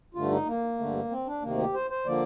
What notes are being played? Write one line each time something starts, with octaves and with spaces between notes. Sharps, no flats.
G2 D3 A3 F4
D#4
A#3
G2 D3 A3
C4
D4
D2 C3 D#3 A#3
G4
C5
C5
D3 F3 A#3 D5